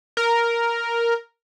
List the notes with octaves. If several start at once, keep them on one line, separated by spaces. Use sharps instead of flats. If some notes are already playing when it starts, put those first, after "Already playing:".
A#4